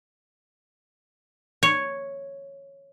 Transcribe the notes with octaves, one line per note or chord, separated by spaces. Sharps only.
C#5